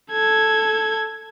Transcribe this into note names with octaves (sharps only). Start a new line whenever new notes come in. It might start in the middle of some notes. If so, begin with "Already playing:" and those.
A4 G#6